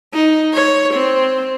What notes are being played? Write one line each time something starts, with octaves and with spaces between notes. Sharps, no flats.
D#4
C#5
C4